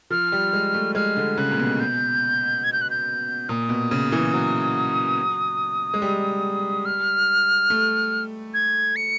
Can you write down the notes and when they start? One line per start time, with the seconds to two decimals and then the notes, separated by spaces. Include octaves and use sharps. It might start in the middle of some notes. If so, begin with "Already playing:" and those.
0.10 F3 F6
0.32 G3
0.53 G#3
0.74 A3
0.95 G#3 F6
1.17 D3
1.38 C#3 F#6
1.51 A#2
1.59 B2
1.80 G6
2.64 G#6
2.73 G6
2.81 F#6
2.90 G6
3.49 A#2 D#6
3.69 B2
3.91 C#3
4.12 E3
4.33 F#3
5.94 G#3
6.02 G3
6.85 F6
7.70 A3
8.54 G#6
8.96 C#7